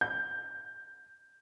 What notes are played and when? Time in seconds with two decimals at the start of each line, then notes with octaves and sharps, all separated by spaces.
0.01 G6